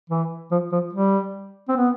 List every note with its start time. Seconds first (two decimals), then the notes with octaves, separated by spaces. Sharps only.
0.10 E3
0.51 F3
0.72 F3
0.93 G3
1.68 C4
1.77 B3